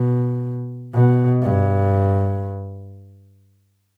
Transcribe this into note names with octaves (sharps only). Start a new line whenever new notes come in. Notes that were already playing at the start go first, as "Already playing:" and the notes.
Already playing: B2
B2
G2